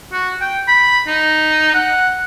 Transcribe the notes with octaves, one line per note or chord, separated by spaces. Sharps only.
F#4
G5
B5
D#4
F#5